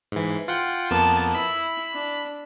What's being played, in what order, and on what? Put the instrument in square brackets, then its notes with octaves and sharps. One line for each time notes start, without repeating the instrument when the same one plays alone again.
[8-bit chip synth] G#2 E3
F4 F#5 G5
[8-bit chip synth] F2 A#3 B3 [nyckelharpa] A5
[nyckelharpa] E4 [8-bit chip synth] B5
[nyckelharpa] D4